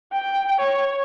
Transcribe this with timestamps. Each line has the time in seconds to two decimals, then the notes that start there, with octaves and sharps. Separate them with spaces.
0.12 G5
0.60 C#5